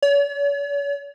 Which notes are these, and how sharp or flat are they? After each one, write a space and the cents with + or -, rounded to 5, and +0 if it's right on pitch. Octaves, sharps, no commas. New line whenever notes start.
C#5 +45